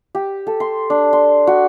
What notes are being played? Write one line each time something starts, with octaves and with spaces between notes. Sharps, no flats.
G4
A4
C6
D4
C6
F#4